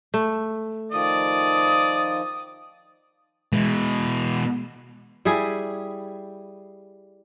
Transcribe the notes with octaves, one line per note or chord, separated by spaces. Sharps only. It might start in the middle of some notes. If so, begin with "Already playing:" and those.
A3
D#3 F3 D5 D#6
B2 E3 G#3
G3 E4 G#4